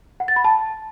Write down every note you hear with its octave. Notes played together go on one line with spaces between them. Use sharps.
F#5
A6
B5
A5